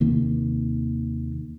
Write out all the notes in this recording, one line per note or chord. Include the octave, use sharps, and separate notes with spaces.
D#2 C3 D#3 A#3